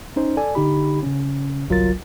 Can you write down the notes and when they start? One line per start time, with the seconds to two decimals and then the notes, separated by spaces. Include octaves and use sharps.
0.16 C#4 D#4 C5
0.37 A4 D5 G#5
0.55 D3 D#4 G4 B5
1.03 C#3 C#4
1.68 G1 C2 F#3 F4 A#4 A6